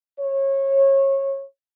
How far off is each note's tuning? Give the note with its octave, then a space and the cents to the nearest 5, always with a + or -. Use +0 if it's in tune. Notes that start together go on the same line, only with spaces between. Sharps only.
C#5 -25